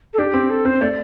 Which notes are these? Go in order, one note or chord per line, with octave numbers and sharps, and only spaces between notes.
A4
D4 G4
C4
A4
C4 C5
A3 D5